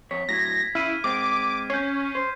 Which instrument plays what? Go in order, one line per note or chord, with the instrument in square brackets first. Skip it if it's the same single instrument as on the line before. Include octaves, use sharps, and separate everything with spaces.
[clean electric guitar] F2 C#5 [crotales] B6
[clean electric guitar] A2 F#3 [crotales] G#6 B6 [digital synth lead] A#6
[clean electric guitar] C#3 [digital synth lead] E4 [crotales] F6 D#7
[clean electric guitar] G#3 C4 [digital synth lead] D6
[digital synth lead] C#4 [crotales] G6 C7
[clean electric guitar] C5